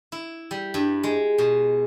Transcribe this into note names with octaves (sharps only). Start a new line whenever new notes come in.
E4
G3
G2
G#3
B2